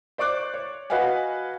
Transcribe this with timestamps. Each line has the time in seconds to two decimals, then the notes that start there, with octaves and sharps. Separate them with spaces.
0.18 C5 D5 C#6 D6 F#6
0.54 C#5
0.90 F#4 B4 D#5 F5 F#5 G#5